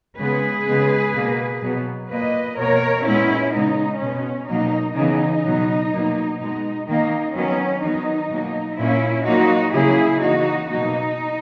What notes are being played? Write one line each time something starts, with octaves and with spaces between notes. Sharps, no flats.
C#3 G#3 B3 G#4 B4
C#3 G#3 B3
B2 A#3
B2 F#3 B3
A#2 A#3 B4 D#5
B2 A#3 A#4 C#5
A#2 G#3 B3 C#4 E4
C#3 G#3 B3 D#4
B2 G#3 B3 C#4
B2 F#3 A#3 D#4
C#3 E3 B3 D#4
B2 F#3 B3
B2 F#3 A#3
B2 G#3 B3 D#4
D#3 A#3 D#4
D#3 F#3 B3 C#4
D#3 F#3 B3 D#4
B2 F#3 A#3
A#2 A#3 C#4 E4
A#2 F#3 A#3 D#4 F#4
C#3 F#3 A#3 E4 G#4
C#3 E3 A#3 D#4 F#4
B2 F#3 A#3 D#4